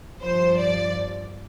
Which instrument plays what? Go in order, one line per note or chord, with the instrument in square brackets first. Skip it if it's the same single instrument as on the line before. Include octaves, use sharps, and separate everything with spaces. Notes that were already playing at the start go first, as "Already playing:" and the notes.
[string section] G2 F3 C5
D5